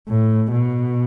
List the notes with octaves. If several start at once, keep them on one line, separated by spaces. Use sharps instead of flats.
A2
B2